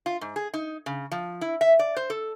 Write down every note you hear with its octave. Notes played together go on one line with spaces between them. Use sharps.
F4
G#2
G#4
D#4
C#3
F3
E4
E5
D5
C5
A4